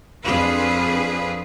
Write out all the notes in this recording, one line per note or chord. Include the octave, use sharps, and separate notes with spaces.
F2 C4 D4 G#4 B4 F5